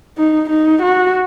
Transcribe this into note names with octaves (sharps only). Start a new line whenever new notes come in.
D#4
D#4
F#4